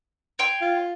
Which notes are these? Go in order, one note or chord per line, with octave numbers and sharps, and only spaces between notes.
C#5 G5 C6
F4